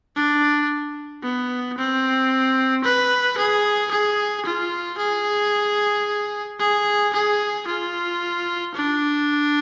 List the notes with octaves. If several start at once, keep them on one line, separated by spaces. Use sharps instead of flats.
D4
B3
C4
B4
G#4
G#4
F4
G#4
G#4
G#4
F4
D4